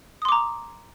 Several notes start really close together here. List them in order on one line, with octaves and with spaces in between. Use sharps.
D#6 C6 D6 A#5